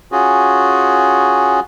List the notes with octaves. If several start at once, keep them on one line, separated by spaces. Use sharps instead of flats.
C#4 F4 F#4 G#4